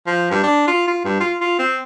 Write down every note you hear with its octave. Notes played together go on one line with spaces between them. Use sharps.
F3
G2
D4
F4
F4
G2
F4
F4
C4